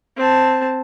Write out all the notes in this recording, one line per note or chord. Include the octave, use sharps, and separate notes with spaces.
C4 A5